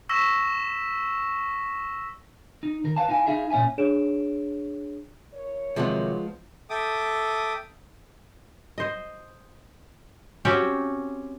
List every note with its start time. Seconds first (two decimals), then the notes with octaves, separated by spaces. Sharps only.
0.09 C#6 E6 A#6 B6 E7
2.63 D#4
2.84 D#3 A#4
2.96 B4 C5 F5 A5
3.09 D#4 E4 F5 G#5
3.26 D#4 E4 G#4 E5 F5
3.50 A#2 C#4 C#5 E5 G#5
3.78 D4 G#4 C#5 D7 E7
5.34 E4 A#4 C#5
5.76 C3 D#3 F3 F#3 G#3 B3
6.70 A4 E5 G5 D6 D#6
8.78 C5 D#5
10.45 C4 C#4 F#4 G4